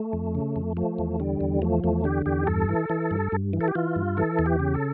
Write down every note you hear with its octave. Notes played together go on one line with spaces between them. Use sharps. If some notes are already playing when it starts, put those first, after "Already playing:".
Already playing: A3
F2
C#3
F2
F3 A3
E2
D3 G3
E2
F3 A3
E2 A3
D3 G4
E2 G4
G2 A4
E3
E3
G2
G2
E3
A4
G4
E3 F4
G2
E3 A4
E2
G4
C#3
A4